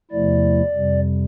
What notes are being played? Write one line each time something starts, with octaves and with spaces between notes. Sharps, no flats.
E2 C3 F3 A3 E4 D5
F2 C3 G3